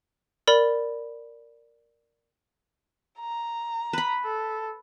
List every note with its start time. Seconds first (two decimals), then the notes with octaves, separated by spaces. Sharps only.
0.47 A#4 D5 B5
3.20 A#5
3.93 B4 B5
4.24 A4